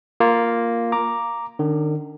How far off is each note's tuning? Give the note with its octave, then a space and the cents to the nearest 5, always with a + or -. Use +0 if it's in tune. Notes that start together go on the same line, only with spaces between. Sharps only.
A#3 +0 F4 +0
A#5 +0 D6 +0
D#3 -40 C#4 +45